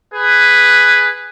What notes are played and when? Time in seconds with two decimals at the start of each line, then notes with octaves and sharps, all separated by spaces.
0.13 G#4 B4